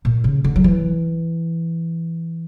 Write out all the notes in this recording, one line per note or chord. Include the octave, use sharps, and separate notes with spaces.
A#2
C#3
D3
F#3
E3